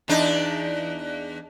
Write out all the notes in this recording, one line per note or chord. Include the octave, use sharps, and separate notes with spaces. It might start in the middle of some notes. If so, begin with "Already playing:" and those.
E2 D4 D#4